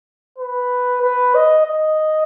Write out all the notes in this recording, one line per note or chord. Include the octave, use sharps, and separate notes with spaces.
B4
B4
D#5
D#5